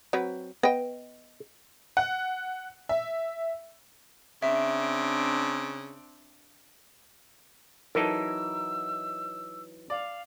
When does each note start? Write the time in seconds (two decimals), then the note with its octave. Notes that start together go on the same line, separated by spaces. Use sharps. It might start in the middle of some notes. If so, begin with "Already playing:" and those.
0.13 F#3 C4 B4
0.63 B3 D#5 G5
1.97 F#5
2.89 E5
4.42 C#3 C4 D4 E5
7.95 E3 F#3 D#4 A4 A#4 E6
9.90 D5 F5